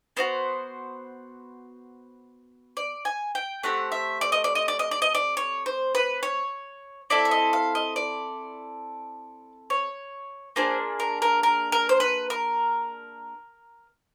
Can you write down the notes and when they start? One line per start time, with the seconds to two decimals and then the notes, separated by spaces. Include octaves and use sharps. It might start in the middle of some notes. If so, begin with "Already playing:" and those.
0.17 B3 D#4 F#4 C5
2.77 D5
3.05 G#5
3.35 G5
3.63 A3 C4 G4 F#5
3.92 E5
4.21 D5
4.32 D#5
4.44 D5
4.55 D#5
4.68 D5
4.79 D#5
4.91 D5
5.02 D#5
5.15 D5
5.37 C#5
5.66 C5
5.95 B4
6.23 C#5
7.10 C4 E4 A4 D5
7.25 E5
7.31 D#5
7.53 F5
7.75 D#5
7.96 D5
9.70 C#5
10.56 A#3 D4 F4 G#4 C5
11.00 A#4
11.22 A#4
11.43 A#4
11.72 A#4
11.89 C5
12.00 B4
12.30 A#4